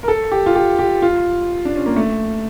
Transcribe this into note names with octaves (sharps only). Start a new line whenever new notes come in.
A#4
A4
G4
F4
G4
G4
F4
D4
C#4
A#3
A3